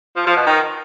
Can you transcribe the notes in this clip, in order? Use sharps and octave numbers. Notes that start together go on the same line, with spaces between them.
F3
F3
B2
D#3